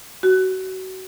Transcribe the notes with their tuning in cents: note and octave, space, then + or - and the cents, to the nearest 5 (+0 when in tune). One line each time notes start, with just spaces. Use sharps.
F#4 +25